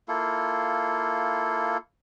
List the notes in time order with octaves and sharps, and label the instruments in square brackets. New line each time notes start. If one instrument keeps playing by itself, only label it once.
[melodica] A#3 E4 F4 A4